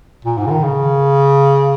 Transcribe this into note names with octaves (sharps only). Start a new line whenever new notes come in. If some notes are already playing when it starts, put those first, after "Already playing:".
A#2
G#2
C#3
D#3
C#3